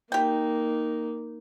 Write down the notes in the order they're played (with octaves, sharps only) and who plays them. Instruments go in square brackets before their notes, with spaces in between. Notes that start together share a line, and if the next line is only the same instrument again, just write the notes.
[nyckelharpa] A#3 D#4 [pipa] G4 G5